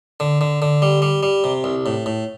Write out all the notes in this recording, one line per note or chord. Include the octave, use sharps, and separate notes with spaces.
D3
D3
D3
G3
G3
G3
C3
C2
A2
A2